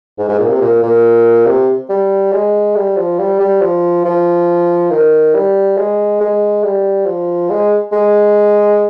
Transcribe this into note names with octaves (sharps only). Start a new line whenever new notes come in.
G#2
G#2
A#2
C3
A#2
A#2
C3
G3
G#3
G3
F3
G3
G3
F3
F3
D#3
G3
G#3
G#3
G3
F3
G#3
G#3